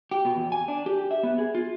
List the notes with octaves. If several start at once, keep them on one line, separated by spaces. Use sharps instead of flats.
G4
B2
E2
G#5
D4
G4
E5
B3
G#4
F4